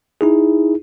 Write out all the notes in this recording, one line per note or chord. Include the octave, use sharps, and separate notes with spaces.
D#4 E4 G#4